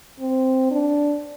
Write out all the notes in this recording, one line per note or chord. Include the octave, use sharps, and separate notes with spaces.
C4
D4